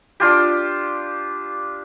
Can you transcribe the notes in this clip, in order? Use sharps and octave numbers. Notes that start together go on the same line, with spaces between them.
D4 F4 G4